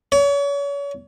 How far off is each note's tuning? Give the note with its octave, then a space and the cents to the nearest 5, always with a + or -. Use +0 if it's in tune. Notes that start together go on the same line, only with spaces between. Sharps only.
C#5 +35